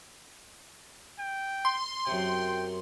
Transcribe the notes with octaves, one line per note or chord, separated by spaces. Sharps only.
G5
C6
F#2 C3 G5